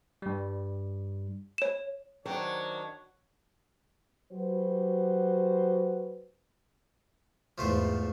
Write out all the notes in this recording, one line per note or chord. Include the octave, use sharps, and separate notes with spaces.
G2 G3
C#5 E7
D#3 F#3 D4 C5 C#5 G5
F#3 F#4 G4 B4 C5
E2 G#2 F3 A3 C5